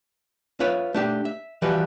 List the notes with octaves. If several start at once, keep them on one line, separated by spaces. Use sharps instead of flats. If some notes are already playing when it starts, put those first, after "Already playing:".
F4 B4 C#5 E5
A3 D4 G4
E5
E3 F3 G3 F#4 G4 B4